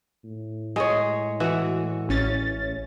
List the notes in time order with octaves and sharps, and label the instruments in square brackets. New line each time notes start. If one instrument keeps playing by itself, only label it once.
[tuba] A2
[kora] G#3 G#4 C#5
[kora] E3 [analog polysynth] F#4
[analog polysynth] A1 C#4 A6